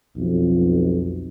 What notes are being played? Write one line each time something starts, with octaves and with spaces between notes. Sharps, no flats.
B1 F2